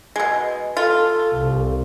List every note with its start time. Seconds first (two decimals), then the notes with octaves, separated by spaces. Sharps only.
0.16 B2 G#3
0.77 F4 A4
1.34 C2